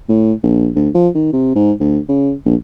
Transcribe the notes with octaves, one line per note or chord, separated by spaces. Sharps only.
A2
A#1
D2
F3
D#3
C3
G#2
D2
C#3
A#1